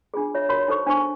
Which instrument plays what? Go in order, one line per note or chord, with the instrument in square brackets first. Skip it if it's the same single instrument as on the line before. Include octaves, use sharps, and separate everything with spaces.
[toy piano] D4 F4 G#4
F4 C#5 E5
F#4 A#4 C#5 B5 C6
D#4 A4 C5 C#6
D4 D#4 C5 A5 C#6